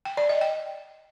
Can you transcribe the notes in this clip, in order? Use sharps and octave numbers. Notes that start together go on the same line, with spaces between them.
G5
D5
D#5
G5